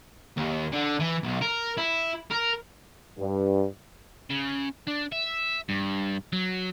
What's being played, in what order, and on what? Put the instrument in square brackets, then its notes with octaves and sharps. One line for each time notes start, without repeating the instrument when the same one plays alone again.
[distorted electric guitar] D#2
D3
E3
B1
A#4
E4
A#4
[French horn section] G2
[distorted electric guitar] C#3
D4
E5
G2
F#3